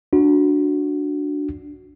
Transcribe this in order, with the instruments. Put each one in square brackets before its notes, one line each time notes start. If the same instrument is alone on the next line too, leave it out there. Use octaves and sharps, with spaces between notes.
[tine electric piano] D4 F#4